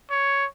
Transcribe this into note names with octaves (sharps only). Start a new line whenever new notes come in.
C#5